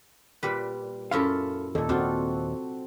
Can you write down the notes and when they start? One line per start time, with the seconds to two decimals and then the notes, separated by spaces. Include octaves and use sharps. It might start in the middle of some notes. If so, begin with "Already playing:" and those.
0.43 A#2 G3 B4
1.11 F#2 E4 F4 A4 F5
1.75 D#2 A#2 A4
1.89 C4 D4 F4 F#4 C5